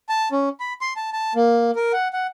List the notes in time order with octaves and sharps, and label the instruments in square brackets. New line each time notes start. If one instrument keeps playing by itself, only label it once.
[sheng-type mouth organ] A5
C#4
B5
C6
A5
A5
A#3
A#4
F#5
F#5